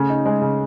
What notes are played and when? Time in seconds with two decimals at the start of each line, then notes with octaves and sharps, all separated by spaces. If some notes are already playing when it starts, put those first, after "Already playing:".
Already playing: C#3 A3
0.10 D#4
0.25 G#3
0.42 C#3